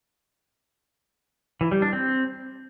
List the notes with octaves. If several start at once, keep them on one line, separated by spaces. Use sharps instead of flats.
E3
G3
D4
C4